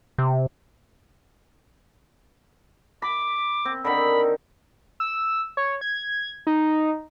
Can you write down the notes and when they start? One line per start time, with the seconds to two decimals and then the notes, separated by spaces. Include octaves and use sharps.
0.18 C3
3.02 B5 D6
3.65 C4
3.85 D3 D#3 B5
5.00 E6
5.57 C#5
5.81 G#6
6.47 D#4